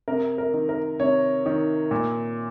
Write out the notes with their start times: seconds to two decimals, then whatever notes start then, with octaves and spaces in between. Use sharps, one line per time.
0.08 C3 A#4
0.38 A#4
0.54 D#3
0.69 A#4
0.99 C3 C#5
1.46 D#3
1.91 A#2